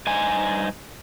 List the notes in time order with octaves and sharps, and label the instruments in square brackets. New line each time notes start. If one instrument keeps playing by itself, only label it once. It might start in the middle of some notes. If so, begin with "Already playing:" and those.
[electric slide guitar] G2 D#4 C5 G#5